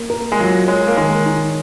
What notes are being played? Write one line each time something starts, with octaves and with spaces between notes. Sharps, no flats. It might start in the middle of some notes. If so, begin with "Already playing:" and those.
Already playing: A#3
A#4
G#3
F#3 F4
G#3 C#5
A#3
D#3 G#3
D#4